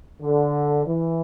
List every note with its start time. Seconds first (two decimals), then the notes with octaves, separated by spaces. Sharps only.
0.22 D3
0.86 E3